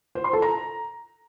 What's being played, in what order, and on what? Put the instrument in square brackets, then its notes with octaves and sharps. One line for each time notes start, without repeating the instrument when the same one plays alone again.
[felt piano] C5
C6
A4
A#5